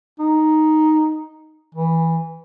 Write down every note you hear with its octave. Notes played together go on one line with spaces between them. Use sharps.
D#4
E3